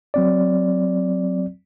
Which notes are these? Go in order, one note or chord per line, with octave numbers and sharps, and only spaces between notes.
F#3 C4 D5